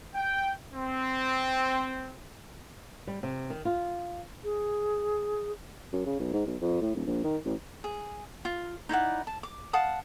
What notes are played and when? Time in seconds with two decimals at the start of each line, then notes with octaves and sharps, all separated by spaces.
0.15 G5
0.74 C4
3.07 G3
3.23 C3
3.50 D#3
3.65 F4
4.43 G#4
5.93 F#2
6.06 C#3
6.20 B1
6.33 G#2
6.47 B1
6.61 F2
6.82 A2
6.95 D#1
7.07 A#1
7.24 D#3
7.45 A1
7.84 G#4
8.45 F4
8.89 D#4 E4 D5 F#5
9.27 A5
9.43 D6
9.73 F5 F#5 A5 D#6